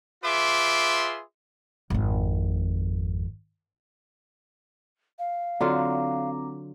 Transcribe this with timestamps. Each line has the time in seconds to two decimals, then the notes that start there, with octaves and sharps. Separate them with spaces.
0.24 F4 G#4 B4 E5 C6 D6
1.90 G#1 F2
5.19 F5
5.61 D3 F#3 C4 F4 A#5 D6